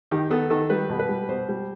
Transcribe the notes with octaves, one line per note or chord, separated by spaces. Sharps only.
D#3 G4
B3 A4
D#3 A4
G3 B4
B2
B4
G3
B2 C5
G3